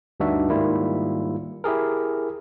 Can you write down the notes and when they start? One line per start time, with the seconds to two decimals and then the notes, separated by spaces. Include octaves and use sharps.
0.20 D2 G2 D4 D#4 F#4 E5
0.49 G#2 D#3 G3 A#3 E4 F4
1.64 E4 G4 G#4 A#4